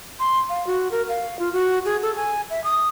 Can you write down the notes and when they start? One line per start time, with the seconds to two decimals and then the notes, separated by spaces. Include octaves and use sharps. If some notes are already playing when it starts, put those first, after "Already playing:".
0.20 C6
0.49 F5
0.67 F#4
0.91 A#4
1.09 F5
1.39 F4
1.53 F#4
1.85 G#4
2.02 A4
2.16 G#5
2.50 E5
2.64 D#6